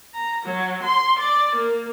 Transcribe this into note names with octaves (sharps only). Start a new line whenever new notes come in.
A#5
F#3
C6
D5
A#3